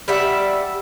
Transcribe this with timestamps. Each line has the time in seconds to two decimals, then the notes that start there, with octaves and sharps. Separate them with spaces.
0.08 G3 D5 E5 F#5